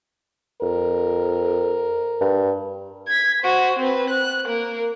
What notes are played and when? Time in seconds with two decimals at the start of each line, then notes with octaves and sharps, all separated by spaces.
0.62 F2 A#4
2.21 G2
3.08 G#6 B6
3.42 F#4 C5
3.80 C4 B4
4.10 F#6
4.45 A#3 A#4